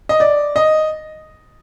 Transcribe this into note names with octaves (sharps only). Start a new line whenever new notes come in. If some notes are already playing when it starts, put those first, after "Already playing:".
D#5
D5
D#5